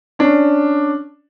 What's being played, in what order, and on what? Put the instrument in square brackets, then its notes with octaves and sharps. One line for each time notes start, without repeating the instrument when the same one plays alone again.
[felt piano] C#4 D4